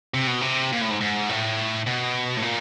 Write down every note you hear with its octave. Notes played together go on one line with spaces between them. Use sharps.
C3
B2
C3
A#2
A2
G#2
G#2
A2
B2
A2
A#2